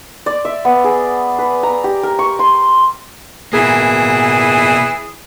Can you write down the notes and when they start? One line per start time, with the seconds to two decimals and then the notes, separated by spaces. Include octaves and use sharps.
0.26 D5
0.45 E5
0.65 B3
0.84 G#4
1.39 B4
1.63 A#5
1.84 G4
2.03 A#4
2.19 C#6
2.39 C6
3.53 B2 E3 A#3 G#4